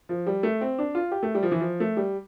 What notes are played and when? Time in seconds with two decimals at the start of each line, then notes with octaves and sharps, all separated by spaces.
0.09 F3
0.27 G3
0.43 A3
0.61 C4
0.78 D4
0.95 F4
1.12 G4
1.23 A3
1.35 G3
1.43 F3
1.51 E3
1.60 F3
1.80 A3
1.97 G3